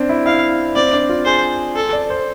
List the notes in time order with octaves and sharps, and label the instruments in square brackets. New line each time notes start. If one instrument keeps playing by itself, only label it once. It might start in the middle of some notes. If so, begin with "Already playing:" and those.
Already playing: [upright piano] C4 D4
E4
[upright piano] E4 [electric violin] F5
[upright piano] C4 [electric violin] D5
[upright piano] D4
F4
[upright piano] G#4 [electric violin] C5
[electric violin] A4
[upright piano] D5
C5